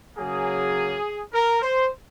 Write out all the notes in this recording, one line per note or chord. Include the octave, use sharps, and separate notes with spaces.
C#3 F#3 A#3 G#4
A#4
C5